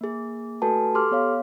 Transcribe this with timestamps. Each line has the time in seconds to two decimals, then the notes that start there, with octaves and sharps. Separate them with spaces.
0.01 A#3 G#4
0.62 A3 F#4 A4 B4 G#5 A5
0.94 G4 A4 C6 D6 F6
1.11 B3 C#5 F5